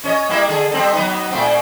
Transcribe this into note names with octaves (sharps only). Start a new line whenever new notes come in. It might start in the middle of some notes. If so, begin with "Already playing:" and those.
C#4 C#5 D#5
G3 A#3 E4
D3 G#4 A4
G3 C4 A4
F#3 B3 D#4
A#2 A3 C4